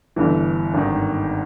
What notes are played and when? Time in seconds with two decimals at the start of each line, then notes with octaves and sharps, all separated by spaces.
0.16 G1 G2 E3
0.74 G#1 G2 D#3